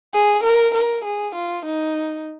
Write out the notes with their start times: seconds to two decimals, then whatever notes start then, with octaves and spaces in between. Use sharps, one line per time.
0.14 G#4
0.44 A#4
0.74 A#4
1.05 G#4
1.35 F4
1.66 D#4